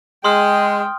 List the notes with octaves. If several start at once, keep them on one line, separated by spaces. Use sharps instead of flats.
G#3 G5 C6 D#6 F6